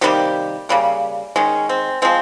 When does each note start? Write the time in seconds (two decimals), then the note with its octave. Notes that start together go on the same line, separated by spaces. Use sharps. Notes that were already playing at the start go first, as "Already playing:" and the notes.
0.01 C3 D#3 G3 A#3 G4
0.69 C#3 G3 A#3
1.36 D#3 G#3 C#4
1.69 C4
2.02 F3 G#3 C4